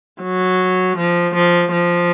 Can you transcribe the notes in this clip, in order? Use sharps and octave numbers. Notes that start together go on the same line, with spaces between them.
F#3
F3
F3
F3